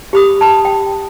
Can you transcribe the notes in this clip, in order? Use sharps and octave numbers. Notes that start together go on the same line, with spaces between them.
G4 B5 D#6
A5 B5
G5